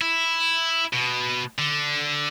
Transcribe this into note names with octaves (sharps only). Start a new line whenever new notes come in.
E4
B2
D3